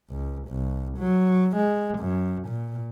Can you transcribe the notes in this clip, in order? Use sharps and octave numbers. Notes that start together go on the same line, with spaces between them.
C#2
C2
F#3
G#3
F#2
A#2